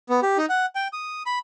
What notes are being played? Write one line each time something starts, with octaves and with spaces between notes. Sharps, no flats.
B3
G4
D#4
F#5
G5
D#6
B5